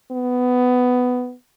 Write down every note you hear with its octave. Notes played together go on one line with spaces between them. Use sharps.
B3